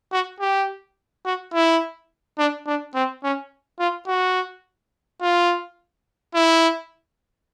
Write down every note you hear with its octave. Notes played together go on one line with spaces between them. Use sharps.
F#4
G4
F#4
E4
D4
D4
C4
C#4
F4
F#4
F4
E4